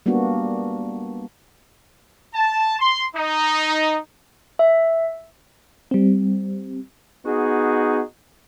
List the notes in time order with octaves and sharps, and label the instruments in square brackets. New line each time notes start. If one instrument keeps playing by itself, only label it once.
[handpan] G3 A#3 B3 D4 F#4
[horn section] A5
C6
D#4
[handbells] E5
[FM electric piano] G3 C4
[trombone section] B3 D#4 F#4 G#4